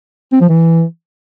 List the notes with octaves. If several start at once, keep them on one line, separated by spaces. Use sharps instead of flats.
C4
F3
E3